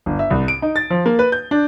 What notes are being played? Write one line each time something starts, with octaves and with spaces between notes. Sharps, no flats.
G1
E5
C2
D7
D#4
A6
F3
A#3
B4
G6
D4